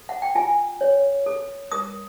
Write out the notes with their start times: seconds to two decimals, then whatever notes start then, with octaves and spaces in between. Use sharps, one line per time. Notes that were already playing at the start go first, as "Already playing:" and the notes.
Already playing: A4
0.09 F#5
0.22 G5
0.35 F4 G#5
0.81 C#5
1.26 A4
1.72 A#4 D#6